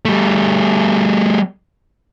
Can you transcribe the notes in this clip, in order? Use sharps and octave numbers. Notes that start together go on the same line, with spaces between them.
G3 A3